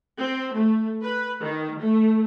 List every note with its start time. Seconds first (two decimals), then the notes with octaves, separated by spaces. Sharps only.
0.18 C4
0.54 A3
1.03 B4
1.41 D#3
1.79 A3